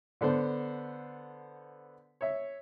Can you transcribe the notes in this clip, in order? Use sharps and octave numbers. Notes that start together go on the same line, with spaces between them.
D3 B3 A4 C5
C#5 E5